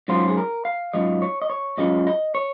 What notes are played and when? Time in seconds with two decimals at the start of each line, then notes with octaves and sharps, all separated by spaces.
0.08 G#2 F#3 C#4 F4 C5
0.28 G#4
0.37 A#4
0.65 F5
0.93 G#2 F#3 C#4 F4 D#5
1.22 C#5
1.42 D#5
1.50 C#5
1.77 G#2 F#3 C#4 F4 D#5
2.07 D#5
2.35 C#5